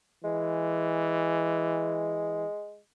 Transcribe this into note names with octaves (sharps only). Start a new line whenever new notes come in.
E3 G#3